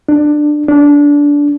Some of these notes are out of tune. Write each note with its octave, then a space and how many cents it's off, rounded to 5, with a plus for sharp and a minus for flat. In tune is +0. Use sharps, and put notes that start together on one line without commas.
D4 +15
D4 -20